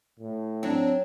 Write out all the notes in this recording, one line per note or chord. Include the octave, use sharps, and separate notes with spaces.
A2
F#3 C4 D4